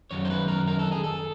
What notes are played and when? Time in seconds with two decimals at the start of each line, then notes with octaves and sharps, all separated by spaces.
0.11 F#2 D#3 F#3 C#5
0.25 C5
0.30 B4
0.48 A#4
0.67 A#4
0.79 A4
0.92 G#4
1.04 A4